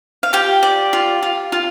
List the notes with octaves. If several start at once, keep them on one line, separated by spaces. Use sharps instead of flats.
F5
F4 G4 G5
D5
F4
F4
F4